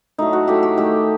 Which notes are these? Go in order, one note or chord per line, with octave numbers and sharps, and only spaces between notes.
A2 F#3 A3 D#4
F#4
A2 F#3 A3 G4
G4
D#3 A3 G4